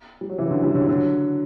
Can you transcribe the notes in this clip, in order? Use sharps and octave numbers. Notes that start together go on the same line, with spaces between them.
G3
F#3
C#3 E3
D3 F#3
E3 G3
D3 F#3
D3 F#3